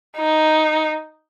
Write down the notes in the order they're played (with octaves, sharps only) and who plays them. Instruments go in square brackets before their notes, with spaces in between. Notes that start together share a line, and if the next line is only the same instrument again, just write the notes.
[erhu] D#4